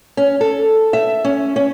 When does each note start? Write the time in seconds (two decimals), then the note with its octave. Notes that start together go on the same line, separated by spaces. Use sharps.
0.17 C#4
0.41 A4
0.93 E5
1.24 C#4
1.56 C#4